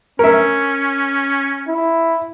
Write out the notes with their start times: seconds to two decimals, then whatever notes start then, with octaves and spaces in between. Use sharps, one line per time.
0.19 C#4 A#4 E5
1.68 E4